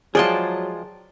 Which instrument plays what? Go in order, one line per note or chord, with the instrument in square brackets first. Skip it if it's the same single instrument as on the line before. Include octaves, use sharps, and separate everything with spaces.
[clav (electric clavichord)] F3 G#3 F4 [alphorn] F#3 [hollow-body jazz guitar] G#4 [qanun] D5 G5 A5